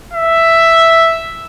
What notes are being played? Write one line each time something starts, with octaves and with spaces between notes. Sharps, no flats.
E5